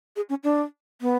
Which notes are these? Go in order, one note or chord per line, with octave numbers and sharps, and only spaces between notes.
G#4
C#4
D4
B3